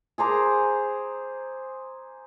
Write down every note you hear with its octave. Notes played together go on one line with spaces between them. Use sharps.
G#4 C5 A#5 D6